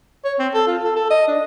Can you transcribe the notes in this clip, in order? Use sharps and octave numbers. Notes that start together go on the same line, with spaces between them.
C#5
C4
A4
F4
A4
A4
D#5
D4